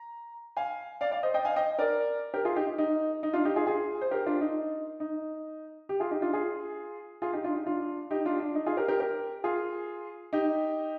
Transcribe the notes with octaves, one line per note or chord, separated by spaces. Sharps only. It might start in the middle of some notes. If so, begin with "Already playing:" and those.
Already playing: A#5
F5 G#5
D5 F5
D5 F5
C5 D#5
D#5 G5
F5 G#5
D#5 G5
A#4 D5
G4 A#4
F4 G#4
D#4 G4
D#4
D#4
D#4
D4 F4
D#4 G4
F4 G#4
F4 G#4
C5
G4 A#4
D4 F4
D#4
D#4
G4
F4 G#4
D#4 G4
D4 F4
F4 G#4
F4 G#4
D#4 G4
D4 F4
D#4
D4 F4
D#4 G4
D4 F4
D4
D#4
F4 G#4
G4 A#4
G4 A#4
G4 A#4
F4 G#4
D#4 G4